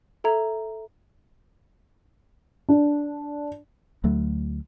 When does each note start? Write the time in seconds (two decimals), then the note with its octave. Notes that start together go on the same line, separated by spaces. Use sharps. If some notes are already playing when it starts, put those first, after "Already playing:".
0.24 A4 E5 A#5 G#6
2.69 D4
4.04 D2 F#3 A3